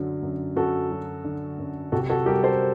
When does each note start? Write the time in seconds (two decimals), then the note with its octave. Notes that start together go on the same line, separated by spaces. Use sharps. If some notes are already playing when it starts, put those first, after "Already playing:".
Already playing: F#2 D3 F#3
0.23 F#2
0.56 F#2 F#4 A4
0.90 F#3
1.24 D3
1.59 F#2
1.92 C3 F#4 A4
2.09 F#4 A4
2.26 G3 G4 A#4
2.43 A4 C5